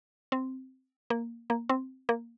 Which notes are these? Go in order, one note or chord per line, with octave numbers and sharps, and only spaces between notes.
C4
A#3
A#3
C4
A#3